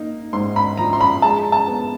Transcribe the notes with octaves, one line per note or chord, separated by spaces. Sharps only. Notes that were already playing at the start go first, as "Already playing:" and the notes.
Already playing: A#3 D#4
G#2 C6
B5
F3 A#5
C6
B5
G#3 A5
A5
B3